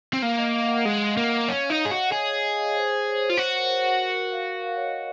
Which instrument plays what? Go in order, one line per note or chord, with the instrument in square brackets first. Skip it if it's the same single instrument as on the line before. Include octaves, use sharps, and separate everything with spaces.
[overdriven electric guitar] C4
[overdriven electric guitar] A#3 [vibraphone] F5
[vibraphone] D#5
F5
F#5
F5
[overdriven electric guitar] G#3 [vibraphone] D#5
[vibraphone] F5
[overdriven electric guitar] A#3 [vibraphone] D#5
[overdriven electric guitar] C#4 [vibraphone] F5
[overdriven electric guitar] D#4 [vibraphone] C#5
[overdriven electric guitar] G#4 [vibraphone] D#5
[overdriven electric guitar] F#4
[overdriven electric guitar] G#4 [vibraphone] C#5
[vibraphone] C#5
D#5
F5
D#5
C5
C5
C#5
C#5
[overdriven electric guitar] F4
[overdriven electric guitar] F#4 [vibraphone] C5
[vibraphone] A#4
G#4
A#4
A#4
F5
F5
C#5
D#5